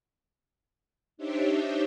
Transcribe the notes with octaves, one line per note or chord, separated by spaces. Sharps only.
D4 D#4 G4 C5 C#5 E5